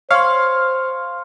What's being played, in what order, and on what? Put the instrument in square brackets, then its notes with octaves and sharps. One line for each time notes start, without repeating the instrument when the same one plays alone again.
[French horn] C5 [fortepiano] C#5 F5 [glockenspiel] C6 F6